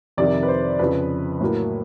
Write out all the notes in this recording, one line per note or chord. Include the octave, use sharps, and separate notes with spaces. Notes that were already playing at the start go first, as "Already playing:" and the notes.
F2 C3 D#3 D5
B4
C5
F2 C#3 F3 B4
A2 F#3 A#3